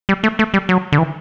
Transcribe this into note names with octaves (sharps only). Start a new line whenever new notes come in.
G3
A3
A3
G3
F#3
D3
E3